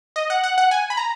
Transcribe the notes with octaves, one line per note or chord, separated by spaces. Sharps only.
D#5
F#5
F#5
F#5
G#5
B5
A#5